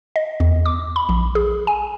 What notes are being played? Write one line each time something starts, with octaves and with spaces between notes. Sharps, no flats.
D#5
E2
D6
B5
A#1
G#4
G#5